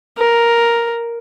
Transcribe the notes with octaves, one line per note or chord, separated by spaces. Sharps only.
A#4